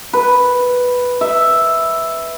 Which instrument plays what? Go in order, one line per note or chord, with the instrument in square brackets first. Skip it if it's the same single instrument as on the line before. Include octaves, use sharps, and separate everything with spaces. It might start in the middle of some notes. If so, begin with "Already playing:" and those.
[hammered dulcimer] B4
E5